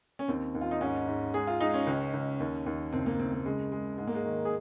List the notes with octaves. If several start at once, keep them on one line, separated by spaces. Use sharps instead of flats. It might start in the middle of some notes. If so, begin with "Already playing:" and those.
C#4
D#2 C4
D#2
F4
D#4
G#2 C#4
G#2
G#3 G#4
F4
G#3 D#4
C#4
C#2
C#2
D#2
D#2
F#1 C4
A#3
F#1 C4
A#3
C#3 G#3
G#3
G#2 G#3
A#3
G#3
D#3
G#4